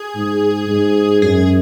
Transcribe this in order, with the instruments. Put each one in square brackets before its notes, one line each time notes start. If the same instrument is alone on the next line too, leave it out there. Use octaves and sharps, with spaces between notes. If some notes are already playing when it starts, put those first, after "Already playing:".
Already playing: [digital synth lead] G#4
[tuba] G#2
G#2
[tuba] F#2 [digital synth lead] G#4